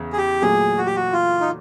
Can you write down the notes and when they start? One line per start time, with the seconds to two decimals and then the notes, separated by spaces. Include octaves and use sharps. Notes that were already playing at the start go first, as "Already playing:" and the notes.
Already playing: E2 C#3
0.13 G#4
0.18 G4
0.42 A#2 F#3 A3 G#4
0.77 F#4
0.86 G4
0.96 F#4
1.13 F4
1.41 D#4